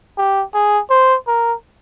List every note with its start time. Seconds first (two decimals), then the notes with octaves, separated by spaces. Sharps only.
0.18 G4
0.54 G#4
0.90 C5
1.28 A#4